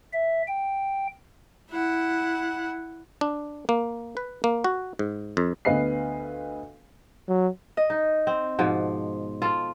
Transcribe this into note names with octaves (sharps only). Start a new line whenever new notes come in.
E5
G5
E4 F#5
D4
A#3
B4
A#3
F#4
G#2
F2
D2 B3 B4 D#5 F5 C7
F#3
D#5
D#4
C4
G#2 B2 F3
F4 A4